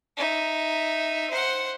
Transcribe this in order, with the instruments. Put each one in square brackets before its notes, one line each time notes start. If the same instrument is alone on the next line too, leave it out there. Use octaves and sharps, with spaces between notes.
[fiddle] D#4 E5
C5 F#5